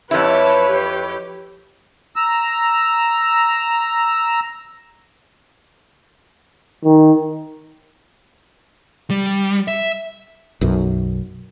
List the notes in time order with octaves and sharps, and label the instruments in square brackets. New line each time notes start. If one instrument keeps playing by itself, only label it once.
[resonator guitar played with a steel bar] F2 E4 [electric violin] G4 A5 [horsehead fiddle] B4 C#5 [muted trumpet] B5
[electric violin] G4
[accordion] A#5 E6
[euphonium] D#3
[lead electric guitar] G3
E5
[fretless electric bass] B1 F#2